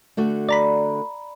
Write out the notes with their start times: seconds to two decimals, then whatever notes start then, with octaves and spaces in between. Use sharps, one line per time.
0.17 D3 A3 F#4
0.49 D5 A#5 B5